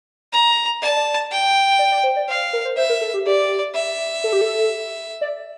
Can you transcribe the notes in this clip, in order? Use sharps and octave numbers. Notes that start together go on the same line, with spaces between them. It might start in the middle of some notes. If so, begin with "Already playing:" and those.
A#5
D5 A5
D5
G5
D5
D5
C5
D5
C5 F5
A#4
C5
C5 E5
A#4
A4
G4
G4 D5
E5
A4
G4
A4
D5